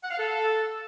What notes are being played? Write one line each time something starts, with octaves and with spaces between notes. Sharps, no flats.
F#5
F5
A4